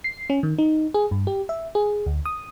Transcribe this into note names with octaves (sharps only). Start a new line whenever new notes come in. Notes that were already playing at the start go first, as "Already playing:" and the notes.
C7
C#4
D#3
D#4
G#4
G2
G4
E5
G#4
D2
D#6